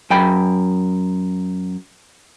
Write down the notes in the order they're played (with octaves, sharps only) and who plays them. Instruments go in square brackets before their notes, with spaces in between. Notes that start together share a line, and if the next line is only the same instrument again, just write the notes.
[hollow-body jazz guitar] F#2 G5 B5